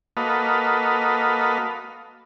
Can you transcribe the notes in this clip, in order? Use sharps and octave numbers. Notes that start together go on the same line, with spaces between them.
A#3 F#4 A4 B4 D#5 F5